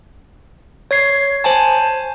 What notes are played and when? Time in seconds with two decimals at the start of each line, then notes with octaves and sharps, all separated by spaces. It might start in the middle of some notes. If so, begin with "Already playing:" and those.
0.91 C#5 G#6 C7
1.44 C5 G#5 A5